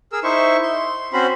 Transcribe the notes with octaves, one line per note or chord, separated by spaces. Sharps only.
G#4 A#4 E6
D#4 E4 C5 E5 C#6
C6
C4 C#4 F#4 C5 B5